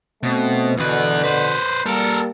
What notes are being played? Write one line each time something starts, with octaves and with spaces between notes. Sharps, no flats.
B2 A3 C4
E2 B2 D3 B4
B4 C5
G3 A#3 A4 A#4